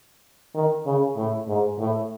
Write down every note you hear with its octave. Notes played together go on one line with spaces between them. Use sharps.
D#3
C#3
A2
G#2
A2